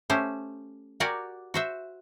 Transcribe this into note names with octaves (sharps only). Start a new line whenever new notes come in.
A3 C#4 G4 C5
F#4 G4 A#4 D5 F#5 G#5
F#4 C5 E5